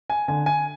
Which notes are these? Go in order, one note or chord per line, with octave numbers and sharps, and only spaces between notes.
G#5
D3 G#5
G#5